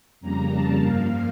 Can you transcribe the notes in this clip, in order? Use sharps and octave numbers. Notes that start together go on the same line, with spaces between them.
F2 C#3 G3 A#3 A#5
A5
G2 F3 A#3 F5